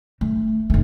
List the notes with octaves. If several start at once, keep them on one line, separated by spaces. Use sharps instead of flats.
A3
F1 A3